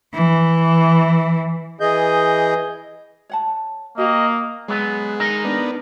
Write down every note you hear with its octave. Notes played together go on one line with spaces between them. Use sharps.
E3
E3 G#4 D#5 G6
C#5 F#5 A5
A#3 F#4 D#5 G5 A#5
F#3 G#3 B3
D#4 A#4 D#5
B3 D4